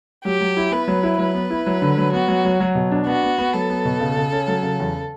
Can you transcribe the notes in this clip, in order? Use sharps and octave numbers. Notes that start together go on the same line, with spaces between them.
F#3 G4
F#3
E4
B3 B4
F#3
E4
F#3 B4
B3
E4
F#3
D3
F#3
B3 F#4
F#3
F#3
F#3
B2
D4
B3 F#4
B3
B3
F#3 A4
B3
B2
C#3
C#3
C#4
F#3
C#3
E2